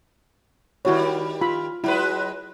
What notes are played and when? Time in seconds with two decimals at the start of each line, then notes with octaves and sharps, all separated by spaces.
0.85 D#3 G3 E4 F#4 C#5
1.41 F4 B5
1.84 F#3 G#3 E4 B4